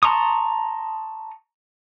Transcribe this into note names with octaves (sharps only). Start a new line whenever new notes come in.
A5 A#5 C6 C#6 D#6